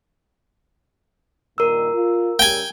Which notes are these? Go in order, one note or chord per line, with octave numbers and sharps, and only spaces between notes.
G2 A#2 D#3 A#4 E6
F4
C#3 G3 G4 G5 G#5